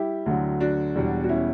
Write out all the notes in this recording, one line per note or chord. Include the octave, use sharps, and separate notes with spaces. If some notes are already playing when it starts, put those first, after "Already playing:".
Already playing: G3 E4 G4
D2 D3 F#3
D4 F#4
E1 E2 B2 G3
F#4
C#4 E4